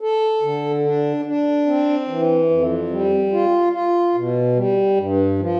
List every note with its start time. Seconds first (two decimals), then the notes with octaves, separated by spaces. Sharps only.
0.01 A4
0.42 D3
0.84 D4
1.25 D4
1.66 C4
2.08 E3
2.49 F2
2.90 G3
3.32 F4
3.73 F4
4.15 B2
4.55 G3
4.97 G2
5.39 F3